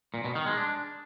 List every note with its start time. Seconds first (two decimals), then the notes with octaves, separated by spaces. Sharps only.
0.14 A#2
0.25 B2
0.35 D#3
0.46 G#3
0.57 D4